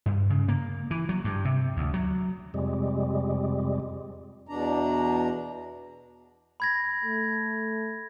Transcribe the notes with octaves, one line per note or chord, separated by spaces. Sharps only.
G2
C#3
A#3
E3
F#3
G2
C3
D2
F#3
F2 C3 G3 G#3
E2 B2 D4 A#5
B5 G#6 A#6
A3